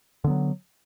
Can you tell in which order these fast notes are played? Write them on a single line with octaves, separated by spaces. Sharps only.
D3 B3 F#3